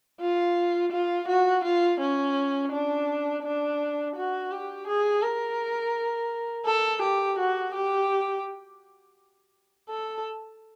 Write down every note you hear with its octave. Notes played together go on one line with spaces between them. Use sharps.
F4
F4
F#4
F4
C#4
D4
D4
F#4
G4
G#4
A#4
A4
G4
F#4
G4
A4